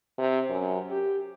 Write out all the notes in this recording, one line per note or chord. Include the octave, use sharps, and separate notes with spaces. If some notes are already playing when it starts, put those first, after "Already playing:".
C3
F#2
G4